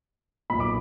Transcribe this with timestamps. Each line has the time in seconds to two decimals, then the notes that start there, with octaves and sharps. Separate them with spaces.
0.50 B1 A#2 B5
0.60 D6